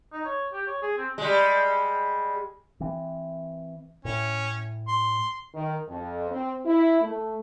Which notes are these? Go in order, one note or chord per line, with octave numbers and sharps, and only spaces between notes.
D#4
C#5
G4
C#5
G#4
C4
G3 G#3
E3 C4
A2 C#4
C6
D#3
F2
C4
E4
A3